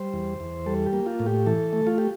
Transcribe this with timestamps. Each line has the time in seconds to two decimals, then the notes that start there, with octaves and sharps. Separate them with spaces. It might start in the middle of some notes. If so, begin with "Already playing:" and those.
Already playing: G3 C5
0.13 E2
0.40 E2
0.66 G3 A4
0.86 G4
0.93 A#3
1.06 F4
1.20 A2
1.26 G4
1.46 E3 A4
1.73 A3
1.87 F4
1.98 G4